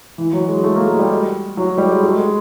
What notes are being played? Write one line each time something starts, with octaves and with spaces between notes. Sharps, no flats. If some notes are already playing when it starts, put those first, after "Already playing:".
E3
F#3
G#3
A3
A#3
G#3
G3
F#3
G3
G#3
A3
G#3